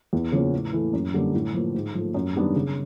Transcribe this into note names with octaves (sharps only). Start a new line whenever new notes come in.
E2
C#3 F3 A#3 C#4
A2
E3 A3
F#2
D3 G3 A#3 C#4
A2
F3 A#3
G#2
F3 A3
F#2
D#3 G3 B3 D4
C#3